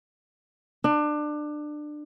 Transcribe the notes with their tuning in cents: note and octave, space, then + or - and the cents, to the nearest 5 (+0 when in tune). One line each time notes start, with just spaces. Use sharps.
D4 +25